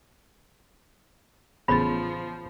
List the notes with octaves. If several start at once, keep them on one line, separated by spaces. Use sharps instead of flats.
A1 C#3 F3 B3 C5 B5 A6